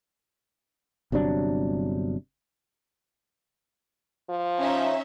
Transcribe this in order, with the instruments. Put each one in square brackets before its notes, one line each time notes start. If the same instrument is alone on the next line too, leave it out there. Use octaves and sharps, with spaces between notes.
[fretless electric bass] G1 C3 F#3 D4
[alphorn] F3
[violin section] C#4 D#4 E5